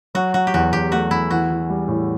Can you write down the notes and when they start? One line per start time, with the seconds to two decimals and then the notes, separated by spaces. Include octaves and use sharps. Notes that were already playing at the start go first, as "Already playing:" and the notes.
0.15 F#3 F#4
0.34 F#3 F#4
0.47 G4
0.54 E2 F#4
0.73 E2 G4
0.92 A3 F#4
1.11 E2 E4
1.31 E3 F#4
1.50 E3
1.70 G3
1.88 A2